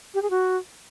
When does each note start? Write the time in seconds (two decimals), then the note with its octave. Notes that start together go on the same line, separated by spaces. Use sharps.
0.14 G4
0.22 G#4
0.30 F#4